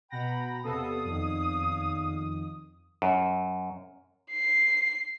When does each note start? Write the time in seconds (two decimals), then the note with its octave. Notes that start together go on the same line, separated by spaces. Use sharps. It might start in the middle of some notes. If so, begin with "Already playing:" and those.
0.10 B2 F#5 G5 A#5 B5 A#6
0.64 E2 C3 B3 A4 F5 D#6
1.05 F2 D#3
3.02 F#2
4.31 C7